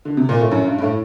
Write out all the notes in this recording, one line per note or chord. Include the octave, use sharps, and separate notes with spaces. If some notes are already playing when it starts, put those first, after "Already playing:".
D3
C3
A#2
A2
F#2
G2
G2
A2